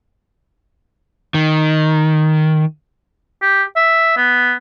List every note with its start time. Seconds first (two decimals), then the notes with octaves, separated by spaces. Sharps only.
1.34 D#3
3.42 G4
3.76 E5
4.17 B3